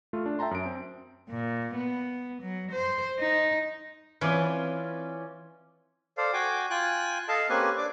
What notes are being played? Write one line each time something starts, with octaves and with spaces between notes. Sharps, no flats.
A3 F4
D4
E5 G5 A5 A#5 C6
F#2 D7
C4
A#2
B3
F#3
C5
D#4
E3 C4 C#4 F4 B4 D5
A4 C5 D5 F5
F#4 G5 G#5 D6
F4 G5 G#5 F#6
A4 D#5 F5 A5
A#3 C4 C#4 G4 B4 G#5
D4 D5 D6